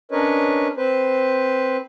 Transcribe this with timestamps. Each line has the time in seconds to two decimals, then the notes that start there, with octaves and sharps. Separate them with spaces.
0.12 C#4 D4 A#4 B4 C#5 D#5
0.77 C4 B4 C5